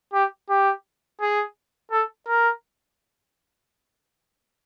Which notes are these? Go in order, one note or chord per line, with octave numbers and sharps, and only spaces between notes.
G4
G4
G#4
A4
A#4